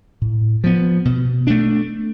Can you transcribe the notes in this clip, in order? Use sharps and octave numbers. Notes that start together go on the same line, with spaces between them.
A2
F3 B3
B2
A3 D4